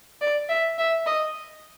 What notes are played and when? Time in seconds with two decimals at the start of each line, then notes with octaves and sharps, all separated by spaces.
0.21 D5
0.49 E5
0.78 E5
1.06 D#5